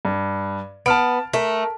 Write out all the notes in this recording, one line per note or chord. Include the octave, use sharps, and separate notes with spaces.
G2
B3 A5 F6 D7
A3 A#4